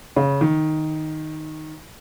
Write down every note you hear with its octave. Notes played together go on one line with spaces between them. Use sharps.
C#3
D#3